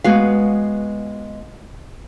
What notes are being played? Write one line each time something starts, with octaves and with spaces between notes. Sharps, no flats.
G#3 B3 F#4 F5